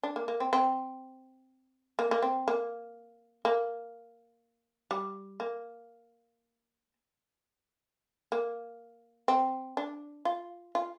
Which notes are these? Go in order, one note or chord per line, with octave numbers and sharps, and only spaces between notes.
D4
A#3
A#3
C4
C4
A#3
A#3
C4
A#3
A#3
G3
A#3
A#3
C4
D4
F4
F4